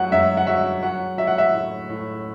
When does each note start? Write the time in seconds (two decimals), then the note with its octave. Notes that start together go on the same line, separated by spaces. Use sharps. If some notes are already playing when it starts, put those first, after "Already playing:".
Already playing: F#2 F#3 F#5
0.12 F#2 E5
0.37 F#5
0.47 F#3 E5
0.82 F#3 F#5
1.17 F#3 E5
1.27 F#5
1.38 E5
1.52 A2
1.89 A2